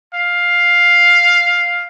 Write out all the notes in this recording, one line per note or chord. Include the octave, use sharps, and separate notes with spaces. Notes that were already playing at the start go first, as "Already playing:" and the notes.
F5